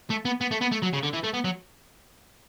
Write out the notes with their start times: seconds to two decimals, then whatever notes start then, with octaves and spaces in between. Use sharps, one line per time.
0.10 A3
0.25 B3
0.41 B3
0.51 A3
0.61 B3
0.71 A3
0.82 F#3
0.93 C#3
1.03 D3
1.13 E3
1.24 A3
1.34 B3
1.44 F#3